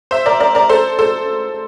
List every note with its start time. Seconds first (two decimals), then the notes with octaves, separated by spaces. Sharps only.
0.11 C5 E5
0.26 A#4 D5
0.40 A#4 D5
0.55 A#4 D5
0.69 A4 C5
0.99 A4 C5